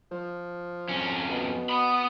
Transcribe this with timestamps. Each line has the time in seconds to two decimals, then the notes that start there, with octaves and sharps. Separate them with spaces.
0.11 F3
0.89 F2 C#4
1.30 B2
1.69 B3 B5 D#6